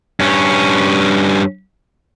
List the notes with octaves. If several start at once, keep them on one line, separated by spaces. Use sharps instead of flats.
G2 C#4